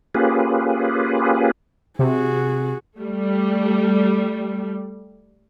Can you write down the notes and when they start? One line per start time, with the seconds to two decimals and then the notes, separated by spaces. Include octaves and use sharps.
0.15 A#3 C#4 F4 G4 G#4 B4
1.99 C3 F#4 G#4
2.98 G3 A3